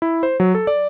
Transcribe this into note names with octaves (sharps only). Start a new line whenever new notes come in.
E4
C5
F#3
A4
D5